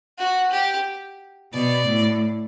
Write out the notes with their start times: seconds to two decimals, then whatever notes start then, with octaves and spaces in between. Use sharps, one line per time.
0.18 F#4
0.52 G4
1.53 B2 D5
1.87 A2